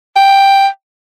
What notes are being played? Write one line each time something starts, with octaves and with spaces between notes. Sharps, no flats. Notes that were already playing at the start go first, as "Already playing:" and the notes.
G5